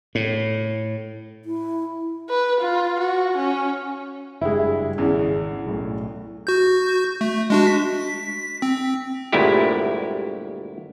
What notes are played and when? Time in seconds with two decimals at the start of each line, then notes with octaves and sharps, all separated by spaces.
0.15 A2
1.44 E4
2.29 B4
2.61 F4
2.99 F#4
3.37 C#4
4.41 F#1 G2 G#3 E4
4.98 G#1 E2 C#3
5.67 B1 A2
6.47 F#4 G6
7.21 A3
7.50 G#3 D4 F#4
7.67 B6
8.62 C4
9.32 G1 D2 A#2 G#3 E4 G4